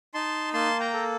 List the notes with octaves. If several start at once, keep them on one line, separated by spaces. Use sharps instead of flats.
D#4 A5 C6
A#3 A5 C6
G5 A#5
A4